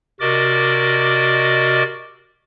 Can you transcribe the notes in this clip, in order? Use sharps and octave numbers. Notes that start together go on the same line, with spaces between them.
C3 F#4 A#4 D5 D#5 D6